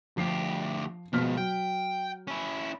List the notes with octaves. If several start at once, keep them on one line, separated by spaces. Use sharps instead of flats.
D2 F3 G4 C7
B2 F3 G#3 F6 B6
F#3 G5
C#4 E4